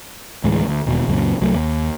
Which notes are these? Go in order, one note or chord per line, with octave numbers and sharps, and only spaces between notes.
D2 A2 E3 G#3
D2
E1 D#2 B2
C#2 F#2 A#2
C2 F#3 A3
D#2